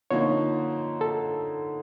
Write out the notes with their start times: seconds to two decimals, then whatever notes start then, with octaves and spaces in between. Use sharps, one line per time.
0.11 D3 F3 A#3 D#4 C#5
1.01 A4